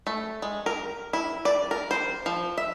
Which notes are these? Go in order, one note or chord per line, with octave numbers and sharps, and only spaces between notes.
A3
G#3
A#4
E4
D5
A#4
C5
F3
E5